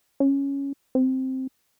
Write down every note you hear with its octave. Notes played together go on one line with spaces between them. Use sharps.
C#4
C4